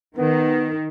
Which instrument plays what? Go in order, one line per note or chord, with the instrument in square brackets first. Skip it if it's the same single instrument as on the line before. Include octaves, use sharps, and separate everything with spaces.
[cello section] D#3 [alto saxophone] B3